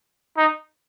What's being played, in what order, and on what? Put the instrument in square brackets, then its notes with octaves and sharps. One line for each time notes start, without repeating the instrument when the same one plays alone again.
[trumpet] D#4